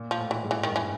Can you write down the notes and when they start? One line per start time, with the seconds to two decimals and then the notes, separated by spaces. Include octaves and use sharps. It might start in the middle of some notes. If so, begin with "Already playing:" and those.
Already playing: A#2
0.11 F3
0.18 A2
0.31 E3
0.44 G#2
0.51 E3
0.63 D#3
0.71 G2 E3